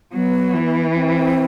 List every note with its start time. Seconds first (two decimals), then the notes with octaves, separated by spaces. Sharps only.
0.13 F#3 B3
0.54 E3
0.95 C4